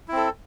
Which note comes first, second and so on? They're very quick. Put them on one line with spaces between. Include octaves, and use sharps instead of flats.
E4 C4 A4